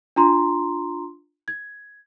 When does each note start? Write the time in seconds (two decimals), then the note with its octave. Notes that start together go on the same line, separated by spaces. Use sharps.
0.16 D4 F4 A#5 C6
1.48 G#6